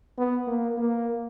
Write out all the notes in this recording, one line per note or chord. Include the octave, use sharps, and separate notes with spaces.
B3
A#3
A#3